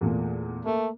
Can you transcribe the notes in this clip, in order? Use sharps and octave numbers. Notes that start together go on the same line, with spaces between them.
E2 A#2 A3
A3 A#3